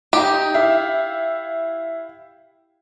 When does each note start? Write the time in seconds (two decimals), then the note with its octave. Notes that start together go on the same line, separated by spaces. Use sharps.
0.13 D#4 G4
0.54 E4 E5 F5